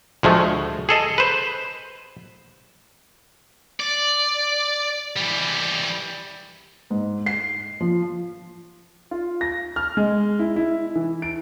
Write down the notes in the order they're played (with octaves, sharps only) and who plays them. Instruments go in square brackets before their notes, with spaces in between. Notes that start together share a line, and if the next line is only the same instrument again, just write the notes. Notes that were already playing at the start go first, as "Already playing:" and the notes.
[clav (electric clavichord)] D2 F3 G#3 A3
G#4 A4 D#5
B4 C5
[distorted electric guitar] D5
E3 G3
[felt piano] G#2
C7
F3
[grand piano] F4
A#6
F6
G#3
E4
E4
E3
D7